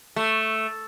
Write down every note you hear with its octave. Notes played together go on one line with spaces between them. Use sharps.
A3